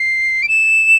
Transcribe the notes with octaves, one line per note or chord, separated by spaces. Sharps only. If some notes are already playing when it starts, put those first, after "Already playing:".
Already playing: C7
D7
E7